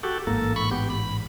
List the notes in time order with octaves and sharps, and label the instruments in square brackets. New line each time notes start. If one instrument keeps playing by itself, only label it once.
[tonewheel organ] F#4 G4 A4
[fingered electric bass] A1 G#2 [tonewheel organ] A#3 A4
[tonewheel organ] B5 C#6
B3 G4
B5